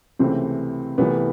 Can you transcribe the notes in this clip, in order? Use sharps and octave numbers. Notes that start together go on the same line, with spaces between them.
C#2 C3 E3 A3 C4
C2 C3 E3 A3 B3